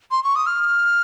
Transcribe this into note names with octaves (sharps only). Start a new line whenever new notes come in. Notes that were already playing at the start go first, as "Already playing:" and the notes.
C6
C#6
D#6
F6